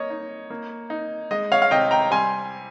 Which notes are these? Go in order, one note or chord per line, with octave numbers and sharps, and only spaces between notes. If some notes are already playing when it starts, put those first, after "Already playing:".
Already playing: A#3 C#5 D#5
D#4
A#3
D#4
G#3 D#5
C#5 F5
F5
C3 D#5 G5
G5 A#5
G3 G#5 C6